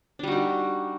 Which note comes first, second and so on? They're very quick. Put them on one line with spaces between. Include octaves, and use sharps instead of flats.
D4 G3 F#4 D#4